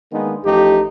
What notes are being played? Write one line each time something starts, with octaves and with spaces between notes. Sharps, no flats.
D#3 G#3 A#3 B3 D4 D#4
A1 F3 A3 D#4 G4